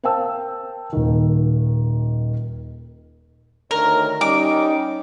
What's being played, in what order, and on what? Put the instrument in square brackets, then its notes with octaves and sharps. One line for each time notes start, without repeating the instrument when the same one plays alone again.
[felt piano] A#4 C5 F5 G5 A5 E6
D#1 D#3
[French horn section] D2 D#3 C#5 [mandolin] A#4
[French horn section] G3 C#4 D#4 [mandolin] D6